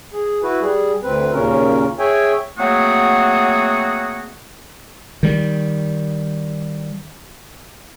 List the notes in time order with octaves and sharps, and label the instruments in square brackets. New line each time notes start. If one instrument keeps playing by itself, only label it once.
[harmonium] G#4
E4 F#4 B4
G3 G#4
D2 C4 B4
D#2 A#2 C#3 C#4 A#4
G#4 C#5 E5 G5 G#5
[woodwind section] F#3 A3 A#3 C4 F#4 G#4
[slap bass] D#3 G3